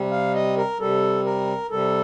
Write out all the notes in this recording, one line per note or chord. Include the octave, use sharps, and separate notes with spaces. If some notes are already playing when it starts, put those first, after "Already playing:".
Already playing: C3 G3
F5
D#5
A#4
C3 G3 A4
A#4
C3 G3 A4